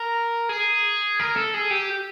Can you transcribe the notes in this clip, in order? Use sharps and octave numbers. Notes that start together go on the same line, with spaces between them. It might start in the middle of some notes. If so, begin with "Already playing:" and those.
Already playing: A#4
G#4
A#4
A4
G#4
G4